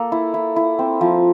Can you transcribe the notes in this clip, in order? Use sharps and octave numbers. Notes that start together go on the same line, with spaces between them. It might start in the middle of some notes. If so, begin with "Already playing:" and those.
Already playing: A#3 A4
E4
E4
E4
C4
F3